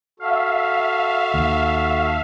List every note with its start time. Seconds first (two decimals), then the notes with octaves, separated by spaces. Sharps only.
0.20 F#4 A4 E5 F5
1.34 D#2